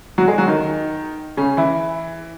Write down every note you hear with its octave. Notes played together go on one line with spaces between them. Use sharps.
F#3 F#4
G#3 G#4
F#3 F#4
D#3 D#4
C#3 C#4
E3 E4